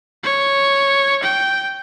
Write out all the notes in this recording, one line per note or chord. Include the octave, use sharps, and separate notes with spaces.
C#5
G5